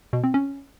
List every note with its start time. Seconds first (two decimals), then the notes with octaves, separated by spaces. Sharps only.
0.13 B2
0.24 C4
0.34 C#4